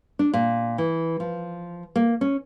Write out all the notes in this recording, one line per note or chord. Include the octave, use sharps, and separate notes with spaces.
D4
A#2
E3
F3
A#3
C#4